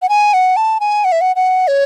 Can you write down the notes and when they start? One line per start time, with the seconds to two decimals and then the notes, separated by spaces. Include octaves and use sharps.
0.02 F#5
0.09 G#5
0.34 F#5
0.56 A5
0.80 G#5
1.05 F#5
1.12 E5
1.21 F#5
1.36 F#5
1.68 C#5